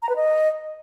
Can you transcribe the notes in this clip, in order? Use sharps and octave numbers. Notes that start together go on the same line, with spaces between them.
A#5
B4
D#5